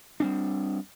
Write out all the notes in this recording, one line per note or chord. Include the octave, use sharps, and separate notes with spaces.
G3 C4 D4